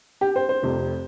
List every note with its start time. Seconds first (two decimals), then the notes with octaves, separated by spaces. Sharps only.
0.21 G4
0.36 C5
0.49 C5
0.62 F1 F2 C3